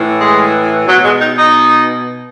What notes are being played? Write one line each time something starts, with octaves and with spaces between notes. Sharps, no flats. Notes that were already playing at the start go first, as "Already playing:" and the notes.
Already playing: A2 E3
G#3
B2 F#3
G#3
D#4
D#4